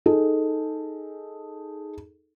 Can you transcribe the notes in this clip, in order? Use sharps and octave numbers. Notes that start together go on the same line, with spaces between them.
D#4 G#4 A4